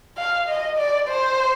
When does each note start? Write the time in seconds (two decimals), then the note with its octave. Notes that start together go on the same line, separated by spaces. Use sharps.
0.18 F5
0.48 D#5
0.78 D5
1.09 C5